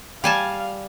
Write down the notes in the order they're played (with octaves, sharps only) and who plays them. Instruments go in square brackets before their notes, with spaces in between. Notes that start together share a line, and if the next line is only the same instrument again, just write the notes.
[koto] G3 G#5 A5 [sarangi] F5